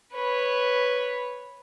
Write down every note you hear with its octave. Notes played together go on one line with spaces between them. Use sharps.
B4 C#5